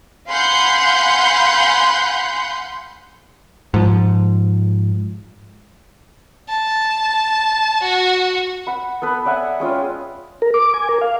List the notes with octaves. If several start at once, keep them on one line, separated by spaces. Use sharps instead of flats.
F5 F#5 G#5 B5 C6 G6
G#2 F3
A5
F#4
F#5 B5
B3 A4 B4
D5 E5 F#5 G#5
G#3 C#4 F4 G5
A#4
D6
G#5
A#4
F5